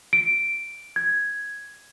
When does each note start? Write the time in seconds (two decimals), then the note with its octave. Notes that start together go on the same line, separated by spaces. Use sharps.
0.13 D7
0.96 G#6